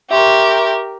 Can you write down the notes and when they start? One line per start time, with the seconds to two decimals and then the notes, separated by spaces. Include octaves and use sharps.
0.11 G4 A#4 E5 C6 C#6